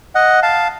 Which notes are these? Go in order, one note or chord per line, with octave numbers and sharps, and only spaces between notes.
D#5 F#5
F5 A5